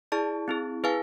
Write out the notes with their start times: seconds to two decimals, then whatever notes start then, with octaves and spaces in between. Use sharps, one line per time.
0.12 E4 G#4 D5 A5
0.48 C4 E4 G#4
0.84 E4 G#4 B4 F5 G#5